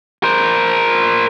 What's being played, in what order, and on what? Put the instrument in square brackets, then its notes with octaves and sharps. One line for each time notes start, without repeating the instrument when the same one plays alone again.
[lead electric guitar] A#4 C5